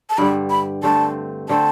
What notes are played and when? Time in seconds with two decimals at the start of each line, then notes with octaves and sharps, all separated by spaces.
0.10 A5
0.18 G2 D3 G3 B5
0.50 B5
0.83 G2 D3 A3 C4 A5
1.49 D3 A3 C4 A5